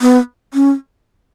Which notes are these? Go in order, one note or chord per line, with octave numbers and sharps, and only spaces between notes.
B3
C#4